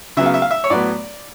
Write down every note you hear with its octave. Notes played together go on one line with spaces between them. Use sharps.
C#3 F#3 B3 E5
F5
E5
F5
E5
C#5
A2 F#3 B3 D5